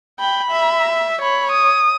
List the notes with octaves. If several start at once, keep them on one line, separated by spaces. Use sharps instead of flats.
G5 B5
E5
C#5 B5
D#6